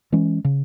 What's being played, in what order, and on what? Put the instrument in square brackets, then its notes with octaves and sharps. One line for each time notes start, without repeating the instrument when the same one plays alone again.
[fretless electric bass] E3 G#3 C#4
C#3